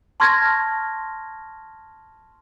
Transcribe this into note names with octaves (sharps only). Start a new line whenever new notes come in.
A5 C6 C#6 F6 G#6 A#6